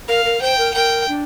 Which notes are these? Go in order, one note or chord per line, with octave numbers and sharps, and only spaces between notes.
A#4 F5
A#4
C5 G5
A#4
A#4 G5
D4